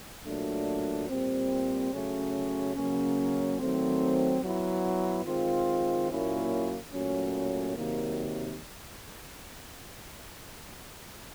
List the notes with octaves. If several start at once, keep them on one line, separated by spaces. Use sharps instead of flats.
A#2 F#3 A3 D4
A#2 G3 C4
C#3 F#3 A3 C#4
C#3 F#3 A#3 C#4
D#3 F#3 A3 C4
F#3 B3 E4
D#3 G#3 C4 F4
A#2 F#3 A#3 C#4 E4
A#2 F#3 A3 C#4
C3 D#3 F#3 A#3